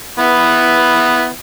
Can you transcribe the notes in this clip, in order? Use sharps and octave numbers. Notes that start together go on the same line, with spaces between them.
B3 E4